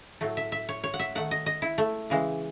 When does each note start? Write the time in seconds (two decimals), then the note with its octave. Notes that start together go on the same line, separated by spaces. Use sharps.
0.21 A2 F#3 A3
0.37 E5
0.52 E5
0.69 C#5
0.84 C#5
0.94 F#5
0.99 E5
1.15 D#3 A3 F#5
1.31 D#5
1.46 D#5
1.62 E4
1.78 A3
2.10 C#3 E3 G#3